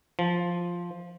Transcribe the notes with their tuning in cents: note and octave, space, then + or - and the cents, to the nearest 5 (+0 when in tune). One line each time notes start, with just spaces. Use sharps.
F3 +0